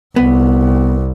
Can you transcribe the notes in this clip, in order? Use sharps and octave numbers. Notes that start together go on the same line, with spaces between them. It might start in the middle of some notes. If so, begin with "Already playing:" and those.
C2 B3